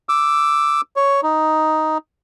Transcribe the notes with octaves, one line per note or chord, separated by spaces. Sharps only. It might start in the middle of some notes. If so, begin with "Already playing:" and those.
D6 E6
C#5
D#4